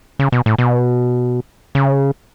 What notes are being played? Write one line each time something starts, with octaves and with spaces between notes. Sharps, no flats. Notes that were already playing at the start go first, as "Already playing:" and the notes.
C#3
B2
A2
B2
C#3